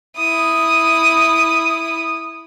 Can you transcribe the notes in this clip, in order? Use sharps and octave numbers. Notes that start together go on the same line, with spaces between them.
E4 D#6